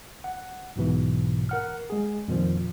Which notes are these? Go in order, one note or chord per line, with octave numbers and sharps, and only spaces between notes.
F#5
B1 G#2 B2 E3
A#4 F#5 F6
G#3 G#4
F2 A#2 D#3 F3